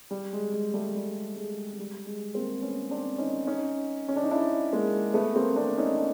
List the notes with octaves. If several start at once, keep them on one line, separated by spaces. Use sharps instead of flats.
G3
G#3
G#3
G3 A3
G3
G#3
G#3
G3
G#3
A#3 C4
B3 C#4
C4 D4
C#4 D#4
C#4 D#4
C#4
D4
D#4
D4 E4
G#3 A#3
A3 B3
A#3 C4
C4 D4
C#4 D#4
D#4
C4 D4